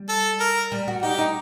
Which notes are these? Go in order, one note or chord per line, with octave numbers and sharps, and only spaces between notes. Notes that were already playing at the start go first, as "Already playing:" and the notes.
Already playing: G3
A4
A#4
G3
F#4
D#4 G4
D#4